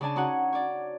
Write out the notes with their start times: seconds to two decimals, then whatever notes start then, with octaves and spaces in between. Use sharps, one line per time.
0.01 C#3 D4 D5 G#5 A5
0.16 C#4 D#4 F#4 F#5 G#5
0.53 C#5 D5